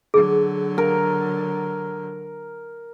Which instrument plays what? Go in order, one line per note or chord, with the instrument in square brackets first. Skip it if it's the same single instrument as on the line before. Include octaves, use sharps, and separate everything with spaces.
[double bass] D3 F#3 [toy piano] G#4
[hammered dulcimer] A#4